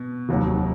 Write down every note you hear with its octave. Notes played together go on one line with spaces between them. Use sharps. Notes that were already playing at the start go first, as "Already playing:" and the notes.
Already playing: B2
F1 D#2 D#3 F#3